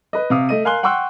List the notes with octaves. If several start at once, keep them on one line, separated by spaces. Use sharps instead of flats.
B4 D#5
C3 F5 D#6
A3 D#5 D#7
A#4 F5 G#5 C6 F#6 G7
F#5 G5 C6 C#6 E6 F#6